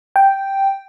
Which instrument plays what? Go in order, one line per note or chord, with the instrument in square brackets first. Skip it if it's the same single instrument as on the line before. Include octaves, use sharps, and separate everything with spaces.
[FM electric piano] G5